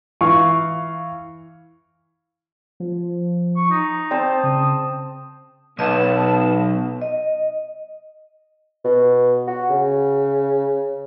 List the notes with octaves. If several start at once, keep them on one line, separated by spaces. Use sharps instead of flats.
E3 F5 C#6
F3
C#6
D#4
C4 C5 D5 A5
C#3 D#6
B1 B3 D#5 A5
D#5
B2
F#4
C#3